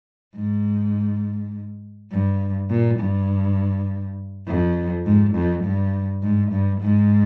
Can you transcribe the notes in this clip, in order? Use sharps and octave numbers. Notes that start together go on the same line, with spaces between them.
G#2
G2
A#2
G2
F2
G#2
F2
G2
G#2
G2
G#2